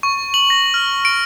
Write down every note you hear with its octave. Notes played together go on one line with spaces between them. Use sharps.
C#6
F#7
A#6
F6
D7